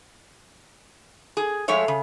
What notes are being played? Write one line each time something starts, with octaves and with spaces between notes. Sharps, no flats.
G#4
F3 G#3 A3 C#5 E5
C#3